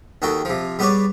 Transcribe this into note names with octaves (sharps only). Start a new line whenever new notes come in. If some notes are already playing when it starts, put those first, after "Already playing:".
D#2 D#3 F#4 A4 G5
C3 F3
G3 B3 G#4 B4 C#5 D5